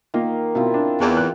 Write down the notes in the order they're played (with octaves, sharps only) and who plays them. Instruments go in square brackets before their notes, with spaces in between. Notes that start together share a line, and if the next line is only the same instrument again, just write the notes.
[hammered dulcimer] D#3 [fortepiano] A#3 F4
[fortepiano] B2 [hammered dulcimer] C4 E4 F4
[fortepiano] D4
[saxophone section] E2
[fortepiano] F#6